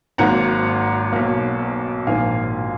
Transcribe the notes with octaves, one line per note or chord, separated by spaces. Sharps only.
G#1 G#2 F#3 A#3 F#5 A#5
B1 B2 A#3
A#1 G#2 D#3 A#3 F5 G#5